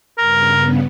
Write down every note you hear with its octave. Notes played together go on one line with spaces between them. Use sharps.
G2 C#3 B3 A#4